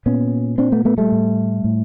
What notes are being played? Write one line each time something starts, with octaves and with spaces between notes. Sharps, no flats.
A#2 B3 C#4
A#2 C4 D4
A3 B3
A3 B3
G3 A3
A2
A2